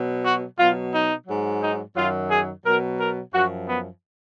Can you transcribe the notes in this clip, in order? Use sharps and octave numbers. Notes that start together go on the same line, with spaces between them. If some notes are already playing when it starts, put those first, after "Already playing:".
Already playing: B2 F#3
F#4
B2 F#3 F4
D#4
G#2 F#3
D#4
F#2 D#3 F#3 F4
G#4
B2 F#3 A#4
A#4
F#2 F3 F#4
B3